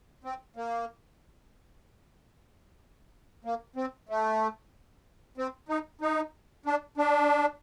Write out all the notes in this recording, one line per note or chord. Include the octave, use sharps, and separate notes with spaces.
C4
A#3
A#3
C4
A3
C4
D#4
D#4
D4
D4